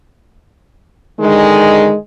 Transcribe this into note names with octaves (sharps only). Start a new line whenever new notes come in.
D3 D#3 G#3